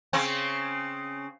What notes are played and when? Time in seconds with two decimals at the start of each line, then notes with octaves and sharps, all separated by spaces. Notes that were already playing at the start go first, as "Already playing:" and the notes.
0.13 C#3 C4 C#4